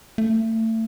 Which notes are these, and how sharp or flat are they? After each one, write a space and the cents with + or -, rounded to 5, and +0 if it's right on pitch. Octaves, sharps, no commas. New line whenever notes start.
A3 +30